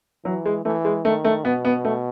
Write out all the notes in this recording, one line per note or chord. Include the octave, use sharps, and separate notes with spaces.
E3 F#3
G#3
E3 A3
G#3
D#3 A3
A3
B2 B3
B3
A3